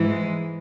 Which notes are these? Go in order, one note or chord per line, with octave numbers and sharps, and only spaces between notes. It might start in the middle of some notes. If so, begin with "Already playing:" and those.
Already playing: G#2 E3
G#3